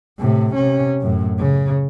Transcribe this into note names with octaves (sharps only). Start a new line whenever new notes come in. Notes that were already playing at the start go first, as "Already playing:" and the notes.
A2 C3
C3 C#4
F#2 A2
C#3